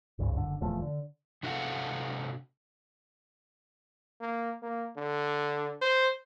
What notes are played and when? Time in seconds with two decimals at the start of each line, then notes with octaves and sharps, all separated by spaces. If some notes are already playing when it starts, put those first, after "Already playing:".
0.19 G#1 C#2 G2
0.37 F#1 D3
0.61 D#1 E2 F3 A3
0.82 D3
1.43 C3 D4 F#4 A4 F5 F#5
4.21 A#3
4.63 A#3
4.97 D3
5.82 C5